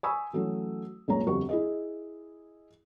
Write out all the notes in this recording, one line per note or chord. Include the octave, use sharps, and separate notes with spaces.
G#5 B5 C#6 D#6 E6
E3 F#3 A3 C#4
C#2 F#2 A#2 C#5 A#5
G1 F2 F#4 G4 C#6
E4 G#4 D#5